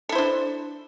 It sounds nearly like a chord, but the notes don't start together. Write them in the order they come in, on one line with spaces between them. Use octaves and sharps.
A4 E4 C5 D4